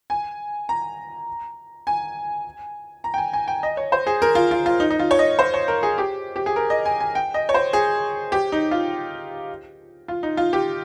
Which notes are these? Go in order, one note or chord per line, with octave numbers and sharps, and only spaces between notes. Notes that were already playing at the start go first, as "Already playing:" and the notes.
G#5
A#5
G#5
A#5
G5
G#5
G#5
G5
D#5
C#5
C5
G#4
A#4
F4
F4
F4
D#4
D#4
F4
C#5
D#5
C5
C#5
A#4
G#4
G4
G4
G#4
A#4
D#5
G#5
G#5
G5
D#5
C#5
C5
G#4
G4
D#4
F4
F4
D#4
F4
G4